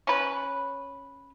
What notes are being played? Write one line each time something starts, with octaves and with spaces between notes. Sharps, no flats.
C#4 B4